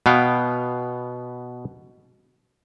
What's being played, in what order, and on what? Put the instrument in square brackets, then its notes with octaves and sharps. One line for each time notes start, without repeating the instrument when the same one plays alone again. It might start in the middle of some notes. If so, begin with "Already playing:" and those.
[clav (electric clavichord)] B2 B3 F5 G5